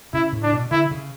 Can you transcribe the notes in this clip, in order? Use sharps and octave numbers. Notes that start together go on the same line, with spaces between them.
C#3 E4
A2
D4
B2
D3 E4
C#3